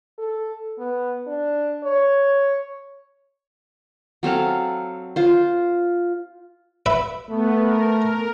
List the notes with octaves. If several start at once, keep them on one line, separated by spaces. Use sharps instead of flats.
A4
B3
D4
C#5
F#3 C4 A4 F5
F4 C5
B4 E5 B5
A3 B3
A#4